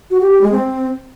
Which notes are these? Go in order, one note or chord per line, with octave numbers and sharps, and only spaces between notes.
F#4
G4
G4
G#3
C4